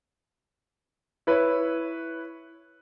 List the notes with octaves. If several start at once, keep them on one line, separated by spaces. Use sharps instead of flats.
E4 B4 C#5